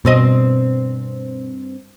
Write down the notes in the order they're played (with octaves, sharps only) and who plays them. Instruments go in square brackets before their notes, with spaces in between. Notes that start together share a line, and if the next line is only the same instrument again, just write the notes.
[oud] G2 C4 D#5 [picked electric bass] B2